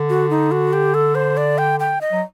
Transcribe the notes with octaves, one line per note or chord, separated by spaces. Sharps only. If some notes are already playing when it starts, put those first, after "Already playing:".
Already playing: D3
F#4
D#4
F#4
G4
A4
C5
D5
G5
G5
D#5
F#3